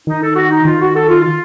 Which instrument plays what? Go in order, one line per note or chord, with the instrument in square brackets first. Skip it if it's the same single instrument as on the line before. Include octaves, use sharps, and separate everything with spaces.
[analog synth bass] D#3 [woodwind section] D#4
[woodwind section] A4
F#4
D#4
[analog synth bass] D#3 [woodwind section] F4
[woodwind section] F#4
A4
F4
F4